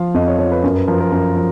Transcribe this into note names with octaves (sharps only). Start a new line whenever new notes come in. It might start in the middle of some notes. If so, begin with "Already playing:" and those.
Already playing: F3 F5
F2 D#5
C#5
F3 C#5
B4
F#2 A#4
B4
F3 A#4
A#4
F#2 A#4
F3